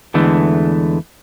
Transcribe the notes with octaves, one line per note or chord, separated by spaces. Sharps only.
E2 D3 E3 G#3 A3